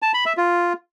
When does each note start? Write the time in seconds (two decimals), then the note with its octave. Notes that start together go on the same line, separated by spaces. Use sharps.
0.02 A5
0.14 B5
0.26 E5
0.37 F4